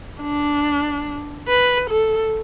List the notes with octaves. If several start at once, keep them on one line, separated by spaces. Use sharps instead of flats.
D4
B4
A4